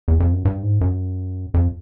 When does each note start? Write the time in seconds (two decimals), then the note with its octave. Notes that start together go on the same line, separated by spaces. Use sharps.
0.08 E2
0.20 F2
0.33 F#2
0.45 G2
0.63 G#2
0.81 F#2
1.54 F2